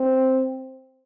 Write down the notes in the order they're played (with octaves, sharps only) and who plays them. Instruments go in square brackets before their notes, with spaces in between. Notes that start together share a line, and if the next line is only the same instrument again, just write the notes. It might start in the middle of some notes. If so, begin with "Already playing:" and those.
Already playing: [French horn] C4